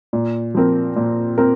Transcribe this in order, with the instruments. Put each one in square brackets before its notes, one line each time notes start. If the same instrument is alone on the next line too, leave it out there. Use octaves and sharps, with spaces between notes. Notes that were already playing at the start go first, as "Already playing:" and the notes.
[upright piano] A#2
F3 C4 A#4
A#2
C4 A#4